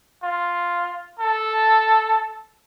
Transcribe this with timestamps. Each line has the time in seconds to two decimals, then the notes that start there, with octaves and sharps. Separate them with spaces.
0.23 F4
1.19 A4